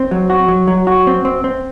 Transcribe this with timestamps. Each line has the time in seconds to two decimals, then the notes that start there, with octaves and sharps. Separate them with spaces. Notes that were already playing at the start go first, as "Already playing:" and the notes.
Already playing: C4
0.11 F#3
0.30 F#4
0.49 F#3
0.68 F#3
0.87 F#4
1.07 C4
1.25 C4
1.44 C4